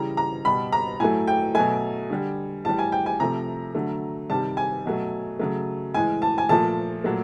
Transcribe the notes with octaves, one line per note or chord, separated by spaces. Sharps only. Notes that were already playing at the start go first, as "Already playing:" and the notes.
Already playing: C#3 E3 G3 A#5
A#5
B2 G3 B5
A#5
A2 F#3 A3 G#5
G5
B2 F#3 A3 G#5
D3 G3
A2 E3 G3 A5
G#5
G5
G#5
C3 F3 A3 A#5
D3 F#3 A3
C3 D#3 G3 A5
G#5
B2 F#3 A3
C#3 F#3 A3
A2 E3 G#3 G#5
A5
G#5
A#2 F3 A3 A5
A#2 F#3 A3